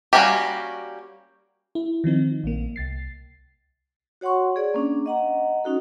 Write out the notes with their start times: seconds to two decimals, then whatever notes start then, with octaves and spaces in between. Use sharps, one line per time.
0.13 G3 A#3 C#4 F#4 G4
1.75 E4
2.04 D#3 F3 C4 D#4
2.44 A#1 A#3
2.76 C2 A6 C7
4.21 F#4 C#5 F#5 C6 C#6
4.56 G#4 D5
4.74 A#3 C#4 D4
5.06 D#5 F#5 A#5
5.64 C#4 D#4 F#4 A4